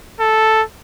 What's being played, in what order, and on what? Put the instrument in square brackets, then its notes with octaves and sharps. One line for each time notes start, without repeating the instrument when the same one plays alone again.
[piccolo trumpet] A4